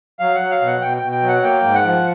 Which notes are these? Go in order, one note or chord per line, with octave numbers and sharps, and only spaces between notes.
F#3 F5
F#5
F#3
F5
B2
F#5
B2 G5
G5
B2
G5
F#3
F#5
A#3 G5
G#2
F#5
F3